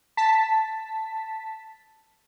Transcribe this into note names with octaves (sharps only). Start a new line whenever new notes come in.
A5 B6